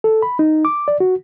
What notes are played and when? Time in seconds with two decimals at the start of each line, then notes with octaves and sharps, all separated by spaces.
0.04 A4
0.22 B5
0.39 D#4
0.65 D6
0.88 D5
1.00 F#4